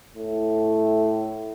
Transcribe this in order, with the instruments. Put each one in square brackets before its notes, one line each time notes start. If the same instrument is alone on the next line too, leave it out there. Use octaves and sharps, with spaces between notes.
[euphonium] A2